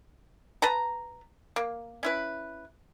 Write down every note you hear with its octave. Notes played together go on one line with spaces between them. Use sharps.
B4 A5 A#5
A#3
C#4 E4 B4